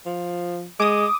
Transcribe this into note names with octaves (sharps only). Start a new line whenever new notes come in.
F3
G#3 D6 D#6